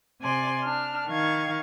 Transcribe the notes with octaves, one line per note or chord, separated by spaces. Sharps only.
C3 D5 G#5 C6
D4 F6
D#3 F5 C#6 G#6